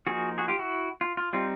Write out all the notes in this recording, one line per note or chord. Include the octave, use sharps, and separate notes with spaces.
F3 A#3 D#4 F#4 G#4
F#4 G#4
F4 G4
E4 F#4
F4
F4
G3 C4 D#4 F4